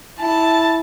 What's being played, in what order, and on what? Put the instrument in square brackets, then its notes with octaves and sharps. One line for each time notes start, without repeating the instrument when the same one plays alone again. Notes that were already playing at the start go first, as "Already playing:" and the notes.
[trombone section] E4 [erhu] A5